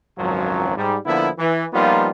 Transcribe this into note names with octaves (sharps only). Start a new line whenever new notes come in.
G#1 C#2 F#2 F3 F#3
G#2 G3
D3 F3 A#3 B3 E4
E3
F3 G3 A#3 B3 D#4 F4